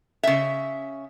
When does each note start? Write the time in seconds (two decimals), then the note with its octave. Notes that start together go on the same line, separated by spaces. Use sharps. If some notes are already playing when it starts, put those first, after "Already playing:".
0.23 C#3 E5